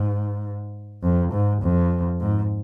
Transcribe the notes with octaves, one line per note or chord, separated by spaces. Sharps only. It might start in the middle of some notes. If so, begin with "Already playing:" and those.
Already playing: G#2
F2
G#2
F2
G#2